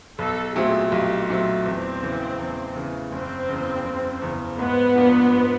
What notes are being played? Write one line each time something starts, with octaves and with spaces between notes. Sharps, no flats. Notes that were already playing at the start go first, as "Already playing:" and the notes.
B1 A4
A#2 F#3 A3 C4 G#4
B1 G4
A#2 F#3 A3 C4
E2 C4
C#3 E3
E2
C#3 E3
F#1 C4
E2 C#3
F#1
E2 C#3
G#2 B3
F3 A#3 D4
G#2